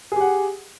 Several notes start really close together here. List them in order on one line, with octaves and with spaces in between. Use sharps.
G#4 G4 F#5